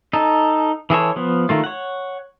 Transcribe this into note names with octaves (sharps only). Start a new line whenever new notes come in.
D#4 A4
E3 G#4 A4 C#5
F3 B3
D#3 A3 F4
C#5 F#5